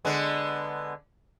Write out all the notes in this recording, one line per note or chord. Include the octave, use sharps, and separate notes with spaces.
D3 G#3 B3